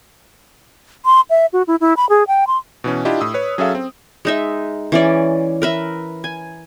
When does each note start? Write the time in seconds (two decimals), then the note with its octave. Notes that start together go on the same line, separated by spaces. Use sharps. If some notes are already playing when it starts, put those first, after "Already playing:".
1.05 C6
1.30 E5
1.53 F#4
1.67 E4
1.81 E4
1.97 B5
2.09 G#4
2.28 G5
2.47 C6
2.84 B2 E3 C#4
3.05 D4 E4 F4 G4 D#5
3.21 A2 D#6 E6
3.34 B4 C#5
3.58 F#3 C#4 G#4 A4 E5 F5
3.75 C4
4.25 G#3 D#4 E5
4.92 E3 C#4 D5
5.62 A#4 B4 E5
6.24 G#5